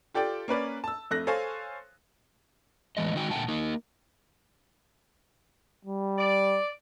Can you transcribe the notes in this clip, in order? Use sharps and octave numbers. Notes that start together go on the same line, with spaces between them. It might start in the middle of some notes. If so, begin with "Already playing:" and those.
F4 G4 A4 D5 G5
A#3 C#4 B4 D5
A5 E6
F2 A3 F#6 A#6
A4 C5 C#5 F5 G#5
A2 E3 G#3 D#5
D#3 G#3 D#4 F#4 G5
A#2 D3 C4 F#5 G5 A5
A#3 D#4
G3
D5